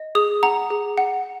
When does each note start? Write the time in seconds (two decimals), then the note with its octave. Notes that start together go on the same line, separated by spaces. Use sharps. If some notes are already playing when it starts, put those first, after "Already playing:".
Already playing: D#5
0.15 G#4 D#6
0.43 F#5 A#5
0.70 G#4
0.98 F#5